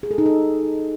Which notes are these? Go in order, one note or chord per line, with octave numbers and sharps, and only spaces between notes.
G#4
A4
D#4
A4